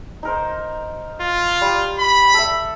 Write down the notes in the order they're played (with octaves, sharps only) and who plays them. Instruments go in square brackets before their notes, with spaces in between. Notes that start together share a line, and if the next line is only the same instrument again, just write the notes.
[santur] D#4 A#4 C5
[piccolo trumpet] F4
[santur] G3
[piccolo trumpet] B5
[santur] A4 E5